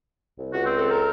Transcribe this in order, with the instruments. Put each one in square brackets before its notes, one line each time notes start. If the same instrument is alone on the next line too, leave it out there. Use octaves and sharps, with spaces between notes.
[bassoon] C2
[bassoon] C#2 [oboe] F#4
[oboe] C4
[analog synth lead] A4
[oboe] A#4